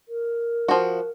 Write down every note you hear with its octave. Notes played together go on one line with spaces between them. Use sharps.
A#4
F3 F#4